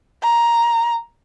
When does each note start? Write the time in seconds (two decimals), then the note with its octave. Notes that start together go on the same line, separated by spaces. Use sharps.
0.23 A#5